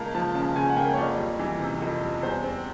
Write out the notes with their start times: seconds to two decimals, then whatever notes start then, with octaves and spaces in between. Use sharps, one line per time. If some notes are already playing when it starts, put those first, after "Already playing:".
Already playing: C#2 A#3 A5 A#5
0.15 F3 A5
0.35 C#3 A5
0.56 C#2 G#5
0.69 F#5
0.77 A#3 G5
0.93 C#5
0.98 F2 D5
1.18 G3
1.39 E3
1.61 C3
1.82 F2
2.02 G3
2.23 E2 C5
2.44 C4